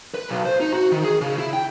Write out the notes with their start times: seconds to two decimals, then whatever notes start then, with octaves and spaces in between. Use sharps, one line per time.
0.14 B4
0.29 B1
0.45 C5
0.60 D#4
0.74 F#4
0.92 D#3
1.04 G#4
1.21 C#3
1.38 E4
1.53 G5